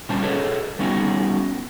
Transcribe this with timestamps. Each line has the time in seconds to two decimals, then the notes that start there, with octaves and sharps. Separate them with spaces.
0.09 A#2 G3 C#4 D4 C5 A5
0.23 G#4 A4 B4 C#5 D#5
0.79 G3 B3 C#4 D#4 F#4 G#4